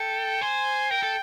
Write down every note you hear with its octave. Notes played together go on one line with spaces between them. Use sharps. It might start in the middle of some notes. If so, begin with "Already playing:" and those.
Already playing: A4 G5
C5 G#5
A#4 G5
A4